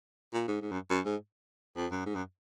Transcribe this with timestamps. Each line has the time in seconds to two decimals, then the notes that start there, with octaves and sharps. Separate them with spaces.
0.33 A#2
0.48 G#2
0.61 G#2
0.71 F#2
0.90 F#2
1.05 G#2
1.76 F2
1.91 F#2
2.06 G#2
2.15 F#2